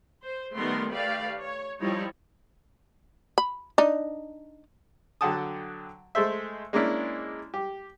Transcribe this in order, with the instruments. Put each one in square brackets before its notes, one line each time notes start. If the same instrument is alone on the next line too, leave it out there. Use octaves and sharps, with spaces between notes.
[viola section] C5
D#3 G3 A3 B3 A#4 C6
A3 G4 B4 D5 F5
C#5
F3 G3 D#4 E4 C#5
[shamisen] B5
D4 D#4
[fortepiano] D3 F#3 F#5 G5 A5 D#6
G#3 A3 A4 C5 E5
G#3 A#3 C#4 D4 E4
G4